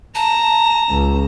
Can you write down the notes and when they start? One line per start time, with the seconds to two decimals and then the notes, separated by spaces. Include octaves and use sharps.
0.15 A5 A#5
0.91 C#2